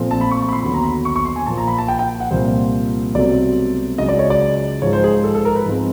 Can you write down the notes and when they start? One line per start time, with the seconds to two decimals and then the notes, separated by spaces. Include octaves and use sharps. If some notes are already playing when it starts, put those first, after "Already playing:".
Already playing: A#2 F3 A3 C4
0.11 A5
0.21 B5
0.31 C#6
0.42 C#6
0.49 B5
0.53 C6
0.63 D#2 D3 F#3 B3 B5
0.74 A#5
0.83 B5
1.05 C#6
1.16 C#6
1.25 C6
1.36 G#5
1.47 A#2 F3 A#3 A5
1.58 A#5
1.68 B5
1.78 A5
1.88 G5
1.99 G5
2.20 F#5
2.31 C2 A#2 F3 A#3 C5
3.14 C2 B2 F#3 A3 C4 D5
3.98 C#2 C#3 F#3 D#5
4.09 D5
4.19 C#5
4.30 D5
4.82 G#2 C#5
4.84 F3 G#3
4.93 C5
5.04 G#4
5.24 A4
5.35 A4
5.45 A#4
5.56 B4
5.66 G#2 F3 G#3 C4